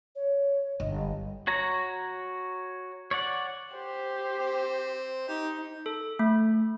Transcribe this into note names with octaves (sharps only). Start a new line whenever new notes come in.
C#5
G1 D#5
F#4 C#5 A#5
C#5 D5 F#5
G4 C5
C4
D#4 G4
A4
A3